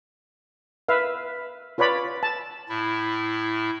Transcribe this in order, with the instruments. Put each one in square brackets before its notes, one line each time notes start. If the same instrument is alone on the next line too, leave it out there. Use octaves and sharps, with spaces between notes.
[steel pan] B4 E5 F5
F4 B4 C#5 D5 B5
A5
[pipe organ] A2 E4